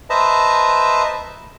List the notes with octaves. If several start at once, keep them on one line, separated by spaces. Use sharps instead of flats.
B4 C5 D#5 E5 A5 A#5